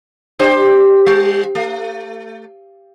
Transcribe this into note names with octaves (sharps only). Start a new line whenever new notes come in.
D4 G4 C5
G3
A3